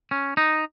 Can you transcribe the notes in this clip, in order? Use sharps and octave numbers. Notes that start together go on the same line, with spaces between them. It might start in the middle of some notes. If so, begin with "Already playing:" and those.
C#4
D#4